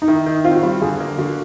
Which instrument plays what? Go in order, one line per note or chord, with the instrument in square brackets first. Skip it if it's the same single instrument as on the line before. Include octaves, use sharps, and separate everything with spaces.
[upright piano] D#4
[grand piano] D#3 [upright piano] E4
[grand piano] D#3
[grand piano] C4 [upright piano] F4
[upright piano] F#4
[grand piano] G3 [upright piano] F4
[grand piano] D3 [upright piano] G#4
[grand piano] A#3
[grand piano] D3 [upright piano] F#4